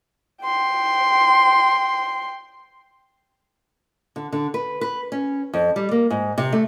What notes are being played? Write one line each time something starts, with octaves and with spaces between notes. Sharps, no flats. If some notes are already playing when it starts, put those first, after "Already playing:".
G5 C6
D3
D3
B4
B4
C#4
F2
G3
A#3
G#2
C3
A3